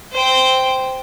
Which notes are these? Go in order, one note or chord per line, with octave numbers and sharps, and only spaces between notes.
C5 G5